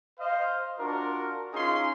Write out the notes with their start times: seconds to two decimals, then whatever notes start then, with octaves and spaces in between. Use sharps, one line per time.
0.19 C5 D#5 F5
0.79 D4 F4 F#4 A#4
1.54 C#4 D#4 F4 G#4 C6